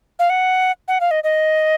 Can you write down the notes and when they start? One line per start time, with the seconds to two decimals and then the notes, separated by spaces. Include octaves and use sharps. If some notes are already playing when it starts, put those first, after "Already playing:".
0.19 F5
0.30 F#5
0.88 F#5
1.01 F5
1.11 D#5
1.24 D#5